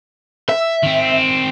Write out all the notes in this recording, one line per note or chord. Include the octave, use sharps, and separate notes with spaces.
E5
D#3 C4